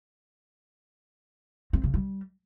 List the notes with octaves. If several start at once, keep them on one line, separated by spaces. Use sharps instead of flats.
C4
C#3
G3